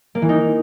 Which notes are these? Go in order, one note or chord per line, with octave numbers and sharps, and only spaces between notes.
A#3
E3
D#4